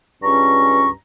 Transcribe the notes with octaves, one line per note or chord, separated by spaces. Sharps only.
C#2 G2 C#4 A#5 C#6